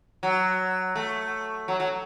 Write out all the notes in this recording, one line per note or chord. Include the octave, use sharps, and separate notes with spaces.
F#3
A3
F#3
F#3